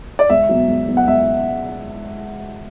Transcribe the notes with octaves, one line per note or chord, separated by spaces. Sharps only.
D5
C#2 E5
B2 F#3 B3
C#2
B2 F#3 B3
F#5
C#2 E5